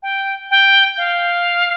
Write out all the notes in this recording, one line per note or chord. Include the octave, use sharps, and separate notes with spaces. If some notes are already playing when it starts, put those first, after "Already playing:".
G5
G5
F5